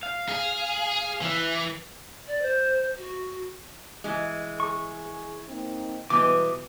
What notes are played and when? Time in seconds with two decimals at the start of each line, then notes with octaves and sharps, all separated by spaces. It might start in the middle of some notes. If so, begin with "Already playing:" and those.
0.03 F5
0.29 G#4
1.22 E3
2.27 D5
2.41 C5
2.97 F#4
4.04 E3 G#3
4.60 G#4 C#6
5.48 A#3 C4 D#4
6.10 B2 E3 G3 G#3 B4 D6